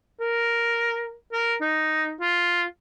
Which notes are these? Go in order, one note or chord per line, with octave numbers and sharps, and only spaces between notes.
A#4
A#4
D#4
F4